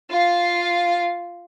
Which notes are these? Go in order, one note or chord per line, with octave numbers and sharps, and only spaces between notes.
F4 F5